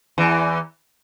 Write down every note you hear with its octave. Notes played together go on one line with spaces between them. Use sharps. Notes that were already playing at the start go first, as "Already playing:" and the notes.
E2 E3